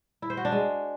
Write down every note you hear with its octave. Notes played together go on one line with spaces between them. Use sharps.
E4
C5
F#4
D4
G#3